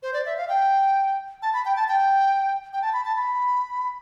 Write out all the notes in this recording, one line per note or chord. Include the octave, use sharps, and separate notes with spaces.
C5
D5
E5
F5
G5
A5
B5
G5
A5
G5
G5
A5
B5
A5
B5